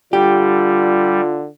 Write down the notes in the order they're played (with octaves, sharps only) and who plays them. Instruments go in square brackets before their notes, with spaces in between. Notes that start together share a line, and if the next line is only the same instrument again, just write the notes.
[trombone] D3 [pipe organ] G3 [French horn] F4 [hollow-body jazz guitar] G4